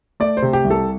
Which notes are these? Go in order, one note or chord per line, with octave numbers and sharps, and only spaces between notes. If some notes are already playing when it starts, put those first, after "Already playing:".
A3 D5
C5
C3
G4
C2
A4